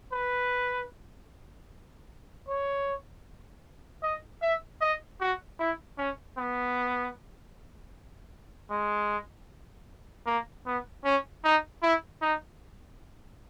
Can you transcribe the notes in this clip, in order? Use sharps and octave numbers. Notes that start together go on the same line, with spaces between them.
B4
C#5
D#5
E5
D#5
F#4
E4
C#4
B3
G#3
A#3
B3
C#4
D#4
E4
D#4